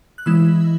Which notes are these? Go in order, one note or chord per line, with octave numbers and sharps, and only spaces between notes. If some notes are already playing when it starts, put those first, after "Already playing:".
F#6
E3 G#3 E4 E6